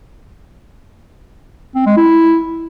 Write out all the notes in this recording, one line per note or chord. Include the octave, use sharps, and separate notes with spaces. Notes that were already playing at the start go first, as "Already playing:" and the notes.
C4
G#3
E4